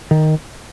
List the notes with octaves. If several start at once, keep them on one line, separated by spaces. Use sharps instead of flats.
D#3